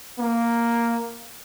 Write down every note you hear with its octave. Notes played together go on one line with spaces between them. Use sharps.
A#3